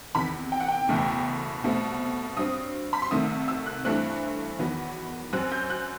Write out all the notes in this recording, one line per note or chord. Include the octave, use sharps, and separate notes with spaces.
E2 C3 D#3 B5
G5
F#5
G5
F#1 E2 B2 A3
C2 B2 A3 C4
G2 F#3 C4 D#6
B5
C6
C2 C3 D#3 A3 D#6
E6
F#6
G2 E3 A3 C4 F#6
E2 D#3 F#3 B3
F#2 F#3 C4 F#6
G6
F#6